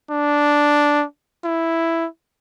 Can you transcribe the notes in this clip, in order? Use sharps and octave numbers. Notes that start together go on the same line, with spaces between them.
D4
E4